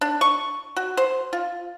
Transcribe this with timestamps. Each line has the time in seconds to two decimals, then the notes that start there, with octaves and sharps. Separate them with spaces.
0.01 D4
0.21 C#6
0.76 F#4
0.97 C5
1.33 F4